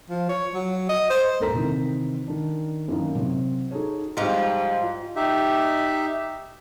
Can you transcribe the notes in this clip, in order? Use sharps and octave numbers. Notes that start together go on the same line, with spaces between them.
F3
C#5
F#3
D#5
C5
E1 A#1 A4 A#4 A#5 B6
C3 D#3 E3
D#3 D4
F#2 D#3 E3 A#3 D#4
C3 F#3
D#4 F#4 G#4 A4 C#5
G#2 F3 G3 F4
D#4 G4 E5